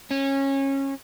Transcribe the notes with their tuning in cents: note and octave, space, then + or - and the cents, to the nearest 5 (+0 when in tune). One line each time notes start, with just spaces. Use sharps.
C#4 -20